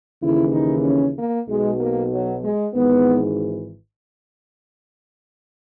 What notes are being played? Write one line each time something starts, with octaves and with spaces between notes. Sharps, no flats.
D#2 C#3 E3 E4
D#4
C#4
A#3
B1 B2 G#3
A#3
F#3
G#3
G#1 G#2 E3 B3